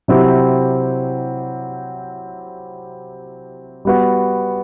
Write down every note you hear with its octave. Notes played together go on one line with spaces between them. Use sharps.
C3 F#3 C4 E4 G4
G3 B3 F#4